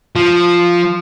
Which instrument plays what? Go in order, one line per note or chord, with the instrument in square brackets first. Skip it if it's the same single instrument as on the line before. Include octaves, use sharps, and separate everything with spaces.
[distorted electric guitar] F3